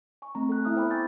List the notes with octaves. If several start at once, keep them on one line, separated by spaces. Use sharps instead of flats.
G#5 C#6
A3 C4 A#5
A4 G5 F#6
B3 E4 E5 A#5 D#6 F6
C5 G5 A#5 B5 D6
G5 G#5 C#6 E6 G6 A6